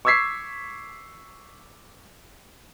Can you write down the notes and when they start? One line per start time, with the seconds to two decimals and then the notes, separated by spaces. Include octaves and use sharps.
0.05 C#6 D6 E6 G#6 B6 C7